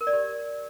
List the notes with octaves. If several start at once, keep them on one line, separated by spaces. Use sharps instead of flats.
A#4
D5
G4